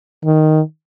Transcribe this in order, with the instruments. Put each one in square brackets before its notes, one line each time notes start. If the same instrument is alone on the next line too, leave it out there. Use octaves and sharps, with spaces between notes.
[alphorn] D#3